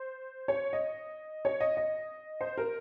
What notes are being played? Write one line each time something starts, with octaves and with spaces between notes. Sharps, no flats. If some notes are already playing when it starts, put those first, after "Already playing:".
Already playing: C5
C#5
D#5
C#5
D#5
D#5
C5
A#4